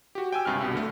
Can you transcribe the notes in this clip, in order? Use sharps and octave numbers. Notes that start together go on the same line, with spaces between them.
F#4 G4
G5 G#5 E6
C#2 G2 C3 F6
C2 G2 B2
D3 A3